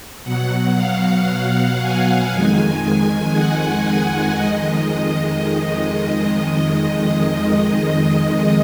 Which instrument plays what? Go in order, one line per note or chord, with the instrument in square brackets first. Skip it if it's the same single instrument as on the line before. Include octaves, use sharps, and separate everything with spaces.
[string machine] B2 F#3 F#5
F5
G#5
F2 D#3 G#3 G#5
G#5
F#5
F2 D#3 G#3 D#5